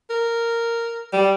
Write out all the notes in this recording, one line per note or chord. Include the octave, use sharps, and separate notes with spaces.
A#4
G3